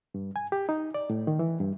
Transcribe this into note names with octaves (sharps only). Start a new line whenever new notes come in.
G2
G#5
G4
D#4
D5
A2
D#3
E3
G2